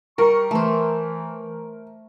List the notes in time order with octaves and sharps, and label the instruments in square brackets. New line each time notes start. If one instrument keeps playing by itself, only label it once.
[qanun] G3 [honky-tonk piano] A#4 [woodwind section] C#6
[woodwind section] E3 [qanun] A3 C5